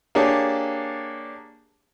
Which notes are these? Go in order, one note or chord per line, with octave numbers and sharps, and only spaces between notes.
A#3 D4 G4 G#4 C#5 A5